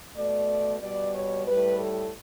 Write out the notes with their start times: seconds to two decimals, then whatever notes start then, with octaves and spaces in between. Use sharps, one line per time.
0.16 B2 A3 D5
0.82 B2 G3 D5
1.15 C#5
1.47 A2 G3 B4
1.80 A4